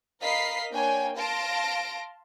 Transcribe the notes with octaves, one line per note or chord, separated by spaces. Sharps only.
A#4 D#5 F5 B5 B6 C7
A#3 D4 C#5 G5 G#5
F5 A5 C6 A#6 D7